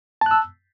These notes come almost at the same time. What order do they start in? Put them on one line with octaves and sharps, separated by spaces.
A5 F#6 E6